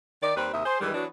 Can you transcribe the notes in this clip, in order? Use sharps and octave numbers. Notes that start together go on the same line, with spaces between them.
D#3 D5
D#2 G3 C4 B4
D#2 C3 D#5 E5
G#4 C5
G2 D#3 E3 G3 G#3
E3 F#3 B3 D4 F#4